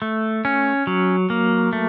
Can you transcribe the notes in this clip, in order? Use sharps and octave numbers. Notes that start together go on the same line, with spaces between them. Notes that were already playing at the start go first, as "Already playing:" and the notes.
A3
C#4
F#3
A#3
A3